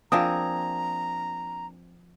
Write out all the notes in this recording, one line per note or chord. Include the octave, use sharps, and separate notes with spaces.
F3 A#3 C4 D4 G#4 A#5 D#6